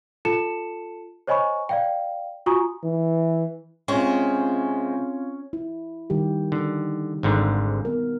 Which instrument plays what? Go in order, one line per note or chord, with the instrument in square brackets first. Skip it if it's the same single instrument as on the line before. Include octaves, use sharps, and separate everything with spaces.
[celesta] F4 A4 A5 C#7 E7
C5 C#5 D#5 G#5 B5 C#6
D5 F5 G5
F4 F#4 G#5 A#5 C#6 D#6
[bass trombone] E3
[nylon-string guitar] C3 G#3 [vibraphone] C4 F4 F5 [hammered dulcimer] C#4
[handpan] E4
D#3 G3 G4
[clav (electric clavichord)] D3 [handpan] D#4
[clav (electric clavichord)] G#1 G#2 D3
[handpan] B3 A#4